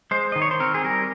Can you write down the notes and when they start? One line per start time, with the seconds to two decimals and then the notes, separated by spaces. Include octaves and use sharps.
0.11 G#3 C5
0.32 D#3 D#5
0.42 C#5
0.51 C5
0.60 C4 A#4
0.74 G#4
0.84 G3 A#4